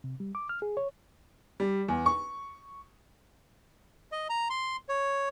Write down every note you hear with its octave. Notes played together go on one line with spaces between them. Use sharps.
C3
G3
D6
F6
G#4
C#5
G3
E2
C#6
D#5
A#5
C6
C#5